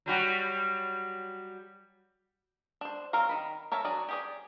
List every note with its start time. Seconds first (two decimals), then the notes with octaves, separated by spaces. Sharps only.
0.06 F#3 G3 F#4
2.81 D4 C5
3.13 F#3 C4 A#4 F5 A#5
3.29 D#3 B5
3.72 A#4 C#5 E5 A5 A#5
3.85 F#3 D4 F#4 G#4 D5
4.09 G4 G#4 D5